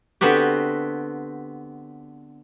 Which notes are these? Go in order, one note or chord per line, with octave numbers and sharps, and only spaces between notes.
D3 B3 C4 F#4 G4